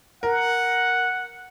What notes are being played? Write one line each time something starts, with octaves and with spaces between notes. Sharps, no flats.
A#4 F#5